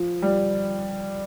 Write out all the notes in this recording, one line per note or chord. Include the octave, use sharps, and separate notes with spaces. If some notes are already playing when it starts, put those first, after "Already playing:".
Already playing: F3
G3